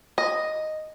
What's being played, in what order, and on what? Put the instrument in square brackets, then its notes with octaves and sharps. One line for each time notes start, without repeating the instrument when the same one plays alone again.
[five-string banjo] D#5